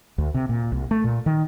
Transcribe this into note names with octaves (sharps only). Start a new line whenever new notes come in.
D2
C3
A#2
C2
A3
A#2
D#3